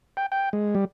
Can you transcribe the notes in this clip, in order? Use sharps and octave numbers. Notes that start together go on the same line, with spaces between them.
G5
G5
G#3
G3